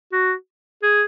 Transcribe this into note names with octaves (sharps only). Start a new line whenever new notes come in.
F#4
G#4